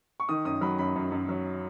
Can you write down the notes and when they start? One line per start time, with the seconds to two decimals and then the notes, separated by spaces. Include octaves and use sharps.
0.20 C#6
0.29 D#3 D#6
0.45 F#2 D#6
0.61 F#3 B5
0.78 F#2 B5
0.96 F#2
1.12 F#2
1.29 F#3